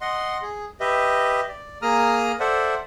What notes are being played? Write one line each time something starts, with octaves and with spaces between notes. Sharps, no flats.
D#5 F#5 C6
G#4
G4 B4 D#5 E5
D5
A#3 G#4 A#5 D#6 F6
A4 C5 D5 E5 F#5